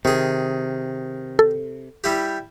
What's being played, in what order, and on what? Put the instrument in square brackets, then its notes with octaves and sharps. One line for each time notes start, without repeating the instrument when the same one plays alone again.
[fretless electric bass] C3 [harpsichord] D#3 G#4
[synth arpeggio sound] A4
[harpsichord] G3 E4 G4